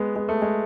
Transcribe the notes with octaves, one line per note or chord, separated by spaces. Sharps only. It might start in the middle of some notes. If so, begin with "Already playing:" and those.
Already playing: G#3 B3
G#3
A3
G#3